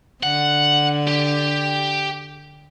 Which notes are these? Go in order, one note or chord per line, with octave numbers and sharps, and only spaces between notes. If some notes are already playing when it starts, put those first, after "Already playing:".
D3 F#5
G4